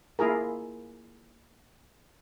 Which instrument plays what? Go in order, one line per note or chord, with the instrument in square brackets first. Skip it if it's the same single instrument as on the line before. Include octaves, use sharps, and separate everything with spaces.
[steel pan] A#3 E4 F4 G#4 A#4